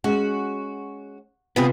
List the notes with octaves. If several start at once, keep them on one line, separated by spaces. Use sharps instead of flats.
G#3 C#4 F#4
C3 B3 C4 F4 G#4 B4